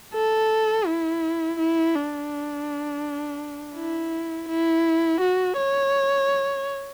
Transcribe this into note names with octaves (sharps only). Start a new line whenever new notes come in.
A4
E4
E4
D4
E4
E4
F#4
C#5